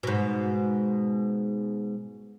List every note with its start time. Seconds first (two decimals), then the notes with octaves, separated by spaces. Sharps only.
0.03 G#2 B2